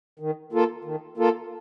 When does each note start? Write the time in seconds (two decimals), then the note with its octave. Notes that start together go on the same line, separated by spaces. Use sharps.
0.19 D#3
0.52 A#3 F4 A4
0.84 D#3
1.17 A#3 F4 A4